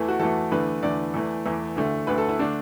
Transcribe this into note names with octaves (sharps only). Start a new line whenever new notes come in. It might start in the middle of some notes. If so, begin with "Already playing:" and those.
Already playing: E2 E3 A3 A4
F#4
E2 E3 A3 A4
E2 D3 A3 B4
E2 D3 A3 D5
E2 E3 A3
E2 E3 A3
D2 D3 A3
D2 D3 A3 B4
A4
E4
D3 A3 D4